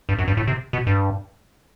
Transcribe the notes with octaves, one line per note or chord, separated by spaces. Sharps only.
G2
F#2
G2
A2
C3
B2
G2